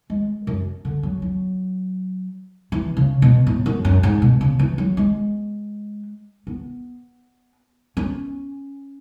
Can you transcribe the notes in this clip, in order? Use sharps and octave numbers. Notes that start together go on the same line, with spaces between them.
G#3
F#2
D3
F#3
F#3
E3
C#3
B2
A2
F#2
F#2
G#2
B2
C#3
E3
F#3
G#3
B3
C#4